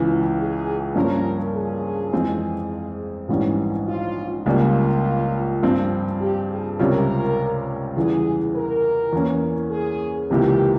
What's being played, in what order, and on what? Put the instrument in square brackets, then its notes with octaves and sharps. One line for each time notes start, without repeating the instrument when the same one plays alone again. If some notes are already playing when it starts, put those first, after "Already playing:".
Already playing: [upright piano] C#2 C#3 E3
[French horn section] G#4
[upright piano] G2 F3 A#3 C#4 [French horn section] A#4
[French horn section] G#4
[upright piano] F2 E3 G#3 C4 F4
A#1 G#2 E3 G3 C#4
[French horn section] F4
[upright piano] C#2 C#3 G3 A#3 [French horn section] F4
[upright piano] G2 F3 C4
[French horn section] G4
G#4
[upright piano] C#2 C3 G3 C#4 F4 [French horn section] A#4
[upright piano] E2 C#3 E3 G3 [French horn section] G#4
[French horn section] A#4
[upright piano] E2 E3 A#3 C#4
[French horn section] G#4
[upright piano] C#2 C3 E3 A#3 [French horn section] G4